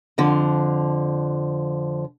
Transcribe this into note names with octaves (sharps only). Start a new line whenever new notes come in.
F2 D3 F3